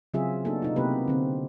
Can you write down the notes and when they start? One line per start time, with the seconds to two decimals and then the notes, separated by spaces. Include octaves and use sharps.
0.14 C#3 F#3 C4 F4 G#4 E5
0.45 A#3 B3 D4 D#4 F#4 A4
0.62 C3 D#4 F4
0.76 C3 A#3 B3 E4 G4 B4
1.08 D3 C4